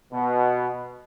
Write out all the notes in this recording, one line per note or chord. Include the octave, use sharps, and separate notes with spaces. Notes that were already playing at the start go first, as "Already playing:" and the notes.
B2